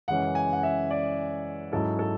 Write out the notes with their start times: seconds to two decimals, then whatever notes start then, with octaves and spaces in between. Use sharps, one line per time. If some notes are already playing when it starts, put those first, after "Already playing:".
0.08 F#2 C#3 E3 G#3 C#4 F#5
0.35 G#5
0.53 F#5
0.63 E5
0.90 D5
1.72 G#2 F#3 C#4 E4 A4
1.99 A4